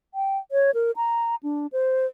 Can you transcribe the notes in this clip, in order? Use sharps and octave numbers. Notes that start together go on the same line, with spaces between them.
G5
C#5
A#4
A#5
D4
C5